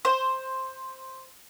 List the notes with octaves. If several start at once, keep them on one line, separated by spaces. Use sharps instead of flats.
C5